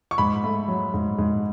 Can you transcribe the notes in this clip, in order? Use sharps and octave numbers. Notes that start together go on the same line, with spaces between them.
C#6
G#2 B5
A3
F#3
G#2
G#2